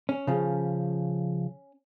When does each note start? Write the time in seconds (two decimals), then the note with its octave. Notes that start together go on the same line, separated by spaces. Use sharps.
0.09 C#4
0.27 C#3 F3